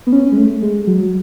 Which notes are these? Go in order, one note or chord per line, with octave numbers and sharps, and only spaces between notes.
B3
C#4
G#3
A3
G#3
F#3